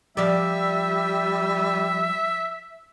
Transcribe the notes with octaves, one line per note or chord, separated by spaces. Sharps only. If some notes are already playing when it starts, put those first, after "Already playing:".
F3 G3 D5 E5